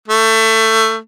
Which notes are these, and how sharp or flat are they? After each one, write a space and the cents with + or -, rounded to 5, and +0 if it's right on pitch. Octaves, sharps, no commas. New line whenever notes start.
A3 +20